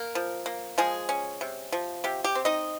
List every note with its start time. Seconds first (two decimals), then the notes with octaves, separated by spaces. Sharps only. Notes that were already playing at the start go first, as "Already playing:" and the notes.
Already playing: A#3 A#4
0.15 F3
0.46 A#3
0.78 F3 G#3 G#4
1.09 C#4
1.41 C3
1.72 F3
2.04 C3 G4
2.24 G4
2.35 C4
2.45 D#4 D#5